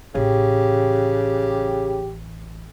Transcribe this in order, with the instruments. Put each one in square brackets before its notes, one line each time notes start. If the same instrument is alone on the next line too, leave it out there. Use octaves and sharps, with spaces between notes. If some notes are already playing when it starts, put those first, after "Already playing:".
[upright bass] A1 [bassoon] C#3 [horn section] G4